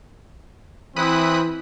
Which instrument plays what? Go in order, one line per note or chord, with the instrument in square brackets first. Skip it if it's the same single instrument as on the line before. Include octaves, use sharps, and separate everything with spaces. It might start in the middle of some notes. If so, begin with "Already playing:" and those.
[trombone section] E3 [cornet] C4 [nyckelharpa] E4 E5 [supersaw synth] B5 D#6 F#6